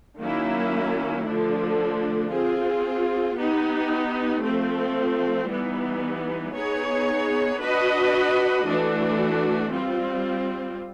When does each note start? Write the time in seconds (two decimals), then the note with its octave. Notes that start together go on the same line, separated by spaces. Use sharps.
0.21 D#3 F#3 A#3 C#4 E4
1.27 D3 F3 A3 D4
2.32 C4 F4 G#4
3.38 B3 D#4 G4
4.43 F3 A3 C4
5.49 E3 G3 B3 D#4
6.54 B3 D#4 G#4 C#5
7.60 D4 F#4 B4 D#5
8.65 E3 A3 D4 F#4
9.71 G3 C4 F4